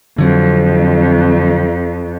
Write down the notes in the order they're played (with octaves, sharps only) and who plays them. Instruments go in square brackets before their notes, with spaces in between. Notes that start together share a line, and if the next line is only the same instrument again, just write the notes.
[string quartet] F2 [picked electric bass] D3 F#3 C4